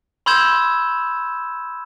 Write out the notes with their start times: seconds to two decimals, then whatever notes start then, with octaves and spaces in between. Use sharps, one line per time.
0.26 B5 C6 E6 G6 G#6 E7